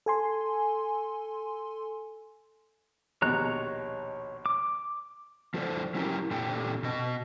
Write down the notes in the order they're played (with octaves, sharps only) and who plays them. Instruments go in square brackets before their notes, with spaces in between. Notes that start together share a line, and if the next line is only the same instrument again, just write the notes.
[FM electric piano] A4 G#5 C6
[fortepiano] A#1 D#2 B2 [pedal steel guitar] C#5 A#5 F#6
[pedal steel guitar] D6
[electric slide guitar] F3 F4 A4 C5 D5
F#3 C#4 E4 G4 A#4
A#2 C4 D4 G4 A4 G5
B2 D#5